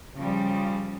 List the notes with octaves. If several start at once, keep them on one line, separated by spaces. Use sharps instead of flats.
C#3 F3 G3